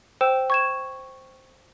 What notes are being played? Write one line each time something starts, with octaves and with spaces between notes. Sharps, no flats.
C5 G5 E6 E7
C#6 G#6 E7